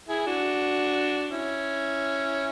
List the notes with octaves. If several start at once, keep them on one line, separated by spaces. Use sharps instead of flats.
E4 G#4
D4 F#4
C#4 E4